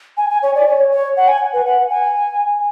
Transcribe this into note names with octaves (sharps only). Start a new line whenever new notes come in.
G#5
G#5
C#5
D5
C#5
C#5
F#5
G#5
B4
F#5
G#5